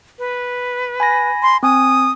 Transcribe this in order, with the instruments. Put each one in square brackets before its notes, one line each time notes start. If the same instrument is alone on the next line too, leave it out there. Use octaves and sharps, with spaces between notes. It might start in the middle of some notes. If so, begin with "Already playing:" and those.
[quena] B4
[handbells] G#5 B5 A#6
[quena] C6
[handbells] C4 G#5 [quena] D#6